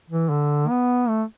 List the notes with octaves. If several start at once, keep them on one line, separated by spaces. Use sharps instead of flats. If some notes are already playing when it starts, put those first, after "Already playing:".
E3
D3
B3
A3